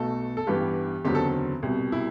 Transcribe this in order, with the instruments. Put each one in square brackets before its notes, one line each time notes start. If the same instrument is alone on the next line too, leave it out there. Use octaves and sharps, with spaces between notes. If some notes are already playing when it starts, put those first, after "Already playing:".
Already playing: [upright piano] B1 B2 A3 A4
A4
A1 G2 E3 B3 G4
F#1 E2 D3 F#3 C4 G4
A4
C2 B2 G3
E4